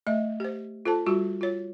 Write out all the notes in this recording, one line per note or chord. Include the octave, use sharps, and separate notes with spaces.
A3 D#5 E5
G4 C5
F4 A4 C5 A5
G3 F4 F#4 C#6
F4 C#5